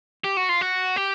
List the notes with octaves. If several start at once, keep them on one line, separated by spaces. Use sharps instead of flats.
G4
F#4
F4
F#4
G4